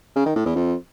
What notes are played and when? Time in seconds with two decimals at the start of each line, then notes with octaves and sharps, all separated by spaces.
0.16 C#3
0.26 D#3
0.36 A2
0.46 E2
0.56 F2